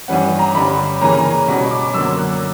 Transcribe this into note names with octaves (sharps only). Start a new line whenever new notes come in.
G2 E3 G3 C#4 F#5
A#5
G2 D3 G3 C#4 B5
C#3 E3 A#3 C#4 A#5
B2 G3 C#4
D6
F#2 D3 A#3 C#4 E6
F#6